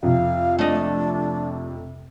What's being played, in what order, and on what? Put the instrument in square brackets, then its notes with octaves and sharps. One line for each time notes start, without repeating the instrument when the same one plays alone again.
[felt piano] F2 C3 [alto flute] F5
[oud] A3 D#5 [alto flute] D4